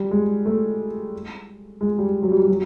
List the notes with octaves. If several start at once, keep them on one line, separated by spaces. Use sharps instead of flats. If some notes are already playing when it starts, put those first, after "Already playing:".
Already playing: G3
G#3
A3
G#3
G3
F#3
G3
F#3